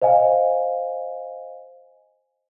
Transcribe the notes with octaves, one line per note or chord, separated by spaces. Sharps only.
C5 D#5 F5 G#5